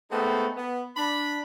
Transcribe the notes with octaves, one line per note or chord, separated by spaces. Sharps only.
G#3 A3 B3 C4 D#4 A4
B3
D4 B5